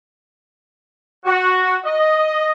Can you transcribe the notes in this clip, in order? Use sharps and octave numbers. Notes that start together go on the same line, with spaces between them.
F#4
D#5